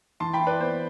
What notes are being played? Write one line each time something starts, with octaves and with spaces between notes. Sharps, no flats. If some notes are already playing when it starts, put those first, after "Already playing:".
E3 A5 C6
G5 B5
E4
B4 D5
B3 C5